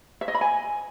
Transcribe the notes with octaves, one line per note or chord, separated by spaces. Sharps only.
E5
D#5
B5
G#5